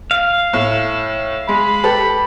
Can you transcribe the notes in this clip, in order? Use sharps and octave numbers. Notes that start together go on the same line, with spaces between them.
F5
A2
G#3 B5
G4 A4 B4